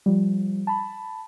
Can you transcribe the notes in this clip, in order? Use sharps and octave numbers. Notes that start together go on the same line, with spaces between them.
F3 G3
A5 B5